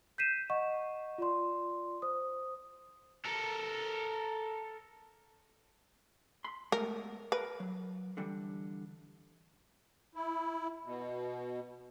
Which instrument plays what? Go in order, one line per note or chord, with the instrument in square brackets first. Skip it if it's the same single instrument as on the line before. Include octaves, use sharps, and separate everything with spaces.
[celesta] G6 B6 C7 D#7 E7
D#5 F#5 C#6
F4 D5 C6
C5 D#6
[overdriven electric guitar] A4 A#4
[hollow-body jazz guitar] B5 C6
[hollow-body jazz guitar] G#3 A3 B3 [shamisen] A#4
[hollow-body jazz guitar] A#4 [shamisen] B4
[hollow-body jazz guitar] F#3
D3 E3 G3
[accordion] E4
B2